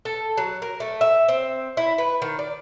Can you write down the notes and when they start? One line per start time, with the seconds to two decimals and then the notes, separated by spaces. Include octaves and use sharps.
0.05 A4
0.37 F#3
0.62 A#4
0.80 A3
1.01 E5
1.29 C4
1.77 E4
1.98 B4
2.22 D#3
2.39 D5